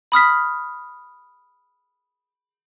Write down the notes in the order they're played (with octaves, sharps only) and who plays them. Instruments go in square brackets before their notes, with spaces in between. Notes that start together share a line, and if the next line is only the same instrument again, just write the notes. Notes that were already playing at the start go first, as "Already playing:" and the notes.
[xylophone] B5 D#6 F6 B6